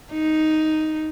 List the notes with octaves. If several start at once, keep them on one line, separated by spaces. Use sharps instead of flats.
D#4